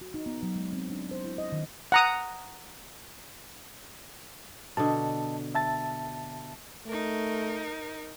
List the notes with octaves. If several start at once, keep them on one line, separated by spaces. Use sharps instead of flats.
F#4
D#4
B3
F#3
G#3
C4
D4
C5
E4
D#5
D#3
F#5 A#5 D#6
B2 D3 D#5 A5
E5 A5 A6
A3 D#4 A#4